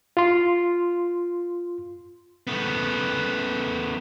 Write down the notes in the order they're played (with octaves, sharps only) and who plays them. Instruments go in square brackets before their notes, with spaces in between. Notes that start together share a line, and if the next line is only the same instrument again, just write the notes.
[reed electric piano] F4 C6
[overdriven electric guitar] A3 B3